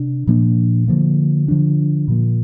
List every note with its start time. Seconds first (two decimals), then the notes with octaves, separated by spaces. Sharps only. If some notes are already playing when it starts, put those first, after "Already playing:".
Already playing: C3 D4
0.27 A#2 F3 A#3 D4
0.88 D3 F3 A#3
1.48 D3 F3 D4
2.08 A#2 F3 A#3